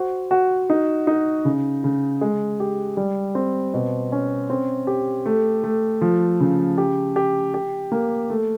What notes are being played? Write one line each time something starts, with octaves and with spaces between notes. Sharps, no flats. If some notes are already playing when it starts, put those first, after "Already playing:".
Already playing: F#4 C5
F#4
D#4
D#4
C#3
C#3
G#3
G4
G3
C4
B2
C#4
C4
G4
A3
A3
F3
C#3
G4
G4
G4
A#3
A3